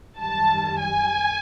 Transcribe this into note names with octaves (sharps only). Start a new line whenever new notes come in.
F#2 D#3 G3 A5
G#5